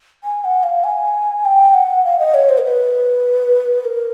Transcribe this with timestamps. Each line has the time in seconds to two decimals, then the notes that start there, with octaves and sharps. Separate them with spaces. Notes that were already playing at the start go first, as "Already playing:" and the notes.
0.24 G#5
0.44 F#5
0.63 F5
0.84 G#5
1.45 G5
1.74 F#5
2.05 F5
2.19 D#5
2.34 C#5
2.49 C5
2.58 A#4
2.64 B4
3.85 A#4